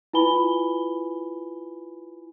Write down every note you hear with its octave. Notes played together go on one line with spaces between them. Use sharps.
E4 F4 B4 G#5 B5 G7